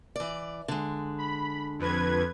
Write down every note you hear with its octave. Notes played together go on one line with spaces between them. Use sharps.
E3 D5
D3 G#3
B5
F2 B4 G#6